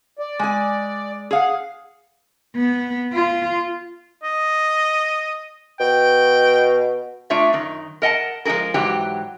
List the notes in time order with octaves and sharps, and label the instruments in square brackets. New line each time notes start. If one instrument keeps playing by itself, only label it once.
[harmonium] D5
[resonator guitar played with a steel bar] G#3 G#5
G#4 F5 F#5
[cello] B3
F4
[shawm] D#5
[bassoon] B2 [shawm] G5
[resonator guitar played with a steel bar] A3 D4 F4 C#5 E5
F#2 D#3
A#4 D#5 F#5 A5
F3 G#3 E4 G#4 A#4
G#2 E3 F#3 G4